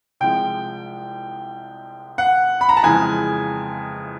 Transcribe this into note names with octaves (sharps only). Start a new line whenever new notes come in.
C2 C3 F3 G#3 G5
F#5
B5
A#5
A5
F2 C#3 E3 G#3 G#5